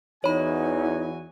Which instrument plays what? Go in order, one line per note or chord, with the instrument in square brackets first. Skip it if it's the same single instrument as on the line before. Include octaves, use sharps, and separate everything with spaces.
[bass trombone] E2 [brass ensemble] E3 F#4 G#5 [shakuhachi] D#4 [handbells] C#5 B5